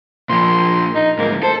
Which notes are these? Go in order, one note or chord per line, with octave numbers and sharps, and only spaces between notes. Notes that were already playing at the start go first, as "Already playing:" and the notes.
A#2 F3 C6
D#4
D2 G#2 A#3
A4 C5